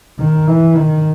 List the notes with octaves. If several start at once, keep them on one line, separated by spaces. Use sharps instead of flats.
D#3
E3
D#3